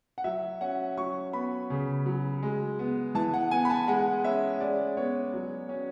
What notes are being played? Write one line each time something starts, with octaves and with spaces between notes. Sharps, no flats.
F#5
F#3 E5
C#4 F#5
F#3 C#6
B3 B5
C#3
F#3
G#3
B3
E3 A5
F#5
B3 G#5
B5
A5
G#3 F#5
C#4 E5
G#3 D5
B3 C#5
F#3
C#4